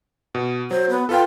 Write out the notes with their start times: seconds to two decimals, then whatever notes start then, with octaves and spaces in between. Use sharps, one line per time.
0.35 B2
0.71 F#3 C5
0.90 B3
1.09 F4 A4 B4 G5